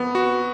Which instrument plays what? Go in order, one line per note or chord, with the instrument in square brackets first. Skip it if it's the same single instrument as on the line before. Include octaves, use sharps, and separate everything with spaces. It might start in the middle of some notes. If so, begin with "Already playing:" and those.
Already playing: [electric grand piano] F2 B3
F#4